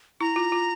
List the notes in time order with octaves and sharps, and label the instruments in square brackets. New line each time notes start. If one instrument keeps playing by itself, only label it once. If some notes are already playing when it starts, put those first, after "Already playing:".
[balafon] E4 [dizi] A#5
[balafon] F4
F4